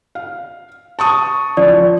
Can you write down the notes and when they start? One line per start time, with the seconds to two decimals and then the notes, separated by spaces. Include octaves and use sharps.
0.15 F5
0.99 A5 C#6 D#6
1.57 F3 D5